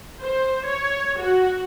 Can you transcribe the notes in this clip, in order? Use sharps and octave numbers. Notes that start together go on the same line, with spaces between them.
C5
C#5
F#4